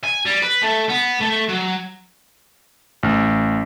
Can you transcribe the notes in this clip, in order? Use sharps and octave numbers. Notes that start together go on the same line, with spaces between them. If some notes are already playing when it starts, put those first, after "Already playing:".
G#5
G3
B4
A3
B3
A3
F#3
A1